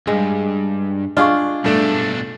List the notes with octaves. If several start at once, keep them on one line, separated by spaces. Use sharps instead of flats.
G2 G#3
D4 F4 G#4 D#5 F5 C#6
B1 G2 A3 D4